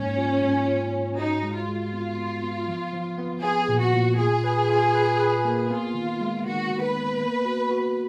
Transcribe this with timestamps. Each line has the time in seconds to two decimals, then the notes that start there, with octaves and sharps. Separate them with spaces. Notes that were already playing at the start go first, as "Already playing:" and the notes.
Already playing: G#2 A#3 C#4
0.17 F4
0.42 G#2
0.67 F4
0.92 G#2
1.17 D#4 F#4
1.43 G#3
1.55 F4
1.67 G#3
1.93 B3
2.17 B3
2.43 B3
2.68 F3
2.93 F3
3.18 B3
3.43 B3 G#4
3.69 A#2
3.80 F#4
3.94 A#2
4.18 F4 G#4
4.44 B4
4.70 F4
4.95 B4
5.20 B4
5.45 A#3
5.70 B3 F4
5.95 D#3
6.20 G#3
6.45 D#3 F#4
6.70 D#3
6.82 B4
6.95 B3
7.20 A#3
7.45 F#4
7.71 F#4